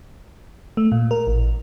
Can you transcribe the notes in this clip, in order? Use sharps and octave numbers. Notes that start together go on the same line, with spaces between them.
A3
A#2
A#4
A1